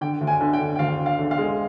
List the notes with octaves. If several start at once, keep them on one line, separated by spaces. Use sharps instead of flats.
D3 G5
D2
G#5
D3
G5
D3
G5
D2 F5
D3
F5
D3
F5
G#3